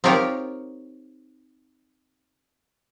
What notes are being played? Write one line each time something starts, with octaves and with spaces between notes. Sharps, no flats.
C4 D#4 F4 G4 A#4 C#5